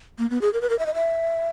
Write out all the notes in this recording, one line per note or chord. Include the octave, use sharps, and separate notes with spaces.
A#3
B3
G#4
A#4
B4
A#4
E5
D#5
E5